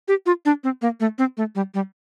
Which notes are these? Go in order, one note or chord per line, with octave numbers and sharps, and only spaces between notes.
G4
F4
D4
C4
A#3
A3
C4
A3
G3
G3